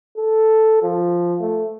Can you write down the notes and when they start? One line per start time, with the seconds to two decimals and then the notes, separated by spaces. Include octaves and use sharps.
0.17 A4
0.83 F3
1.41 A3